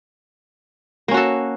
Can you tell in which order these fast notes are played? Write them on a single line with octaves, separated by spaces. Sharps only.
A#3 C#4 F#4 A4